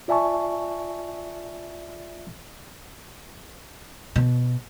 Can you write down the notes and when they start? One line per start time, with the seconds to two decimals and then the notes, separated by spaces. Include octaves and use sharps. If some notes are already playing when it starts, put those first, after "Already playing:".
0.08 F4 D5 E5 G#5 A5 C#6
4.16 B2